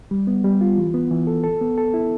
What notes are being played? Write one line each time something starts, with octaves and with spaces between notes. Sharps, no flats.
G3
B3
G3
F4
E3
B3
E3
A4
A4
B3
A4
E4